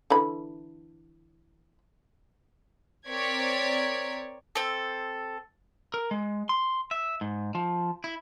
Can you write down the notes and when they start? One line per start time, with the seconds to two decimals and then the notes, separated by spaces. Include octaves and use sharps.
0.10 D3 E3 B5
3.09 C4 A#4 C#5 D5 G#6 B6
4.55 C4 A4
5.94 A#4
6.11 G#3
6.49 C6
6.91 E5
7.21 G#2
7.55 F3
8.04 E4